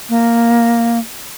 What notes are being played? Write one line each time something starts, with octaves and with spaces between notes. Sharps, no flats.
A#3